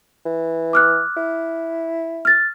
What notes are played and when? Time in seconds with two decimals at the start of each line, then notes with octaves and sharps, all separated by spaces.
0.25 E3
0.73 D6 F6 F#6
1.17 E4
2.25 F6 A6